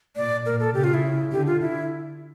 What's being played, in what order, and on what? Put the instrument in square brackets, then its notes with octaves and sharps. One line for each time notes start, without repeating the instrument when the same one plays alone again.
[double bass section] A#2 [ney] D5
[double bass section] A#2 [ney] A#4
[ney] A4
[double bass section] C#3 [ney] G4
[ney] F4
E4
[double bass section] D3 [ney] G4
[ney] F4
E4